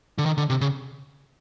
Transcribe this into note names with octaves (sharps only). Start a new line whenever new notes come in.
D3
D#3
D3
C3
C#3